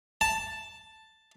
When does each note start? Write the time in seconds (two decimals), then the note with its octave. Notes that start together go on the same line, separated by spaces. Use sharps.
0.21 A5